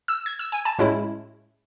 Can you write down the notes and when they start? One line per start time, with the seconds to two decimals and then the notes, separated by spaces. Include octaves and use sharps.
0.08 E6
0.26 G#6
0.39 E6
0.52 G#5
0.65 A5
0.78 A2 G#3 C#4 E4